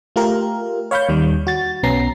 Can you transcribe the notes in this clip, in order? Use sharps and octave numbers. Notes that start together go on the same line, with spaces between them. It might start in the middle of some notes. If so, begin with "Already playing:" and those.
A3 F4 G4 A#4
C#5 F5 B5 C#6 G6
D#2 D#3 G3
F#4 A6
B1 B3 C#4 A#5 C7